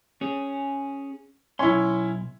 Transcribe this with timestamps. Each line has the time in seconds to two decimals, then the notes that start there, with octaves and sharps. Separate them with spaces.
0.21 C#4 G#4
1.59 B1 C#4 E4 C6